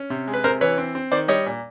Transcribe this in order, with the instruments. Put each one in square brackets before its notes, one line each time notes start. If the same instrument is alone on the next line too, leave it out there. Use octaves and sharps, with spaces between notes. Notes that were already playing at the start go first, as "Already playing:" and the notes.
Already playing: [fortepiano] C#4
C3
G#3
B4
C3 A#4 C5
E3 B4 C#5
C4
C4
D#3 C5 D5
G3 C#5 D#5
A#2